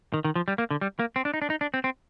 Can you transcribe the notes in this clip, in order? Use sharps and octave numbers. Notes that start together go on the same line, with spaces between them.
D#3
D#3
F3
G3
A#3
D3
G3
A#3
C4
D4
D#4
D4
D#4
D4
C4
C4